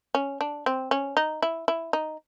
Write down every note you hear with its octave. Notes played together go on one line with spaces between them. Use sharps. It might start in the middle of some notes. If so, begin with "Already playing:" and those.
C#4
D4
C4
C#4
D#4
E4
E4
D#4